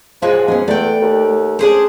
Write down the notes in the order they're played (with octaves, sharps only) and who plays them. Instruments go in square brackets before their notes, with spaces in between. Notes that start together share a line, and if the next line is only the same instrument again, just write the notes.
[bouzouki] A#2 F#3 G#3 [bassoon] F3 [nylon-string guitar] F4
[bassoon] G#2 [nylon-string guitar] B3 C#4 G#4
[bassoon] E2 [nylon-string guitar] A3 [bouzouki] D5 G5
[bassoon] D#2
[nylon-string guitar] C#4 [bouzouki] D4 G#4 C5